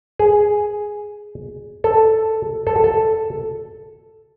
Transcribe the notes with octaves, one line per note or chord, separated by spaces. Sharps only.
G#4
A4
A4
A4